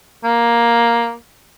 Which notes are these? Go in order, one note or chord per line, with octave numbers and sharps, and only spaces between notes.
A#3